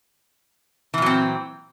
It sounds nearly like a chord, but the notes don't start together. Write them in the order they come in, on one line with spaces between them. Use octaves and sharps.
E3 A#2 F#3 C4